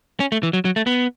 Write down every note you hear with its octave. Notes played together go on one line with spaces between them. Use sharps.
C#4
A3
E3
F#3
F#3
A3
B3